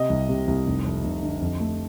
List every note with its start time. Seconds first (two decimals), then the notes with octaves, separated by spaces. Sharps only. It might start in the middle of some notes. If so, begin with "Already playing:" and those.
Already playing: C3 D#5
0.10 C2
0.29 C3
0.47 C2
0.66 F1
0.84 F2
1.04 F1
1.23 D3
1.41 F2
1.60 A3